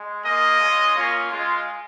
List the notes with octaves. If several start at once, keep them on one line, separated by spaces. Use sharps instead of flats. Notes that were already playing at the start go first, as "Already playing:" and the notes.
Already playing: G#3
A#3 F4 D#5
G#3 C#4 F4
A#3 C#4 F4
G#3 F4